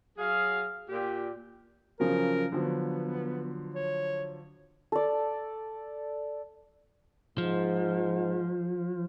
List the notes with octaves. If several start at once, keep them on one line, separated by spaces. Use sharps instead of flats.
F#3 G#4 F5
A#2 G4
C#3 F3 F#3 A#4
D3 F3 F#3 B3
C#5
A4 D5
G#2 F3